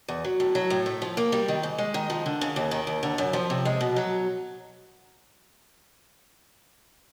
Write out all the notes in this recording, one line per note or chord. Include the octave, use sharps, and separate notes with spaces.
E2
F#3
A2
F#3
A2
A3
F3
A#3
G3
D#3
G#2
G#3
D#3
F3
D3
C#3
D#2
D#3
D#2
D3
F#2
F3
C3
G#3
B2
F#3